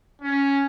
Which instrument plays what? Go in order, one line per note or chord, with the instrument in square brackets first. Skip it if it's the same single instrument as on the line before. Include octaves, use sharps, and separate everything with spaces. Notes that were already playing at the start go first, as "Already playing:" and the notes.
[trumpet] C#4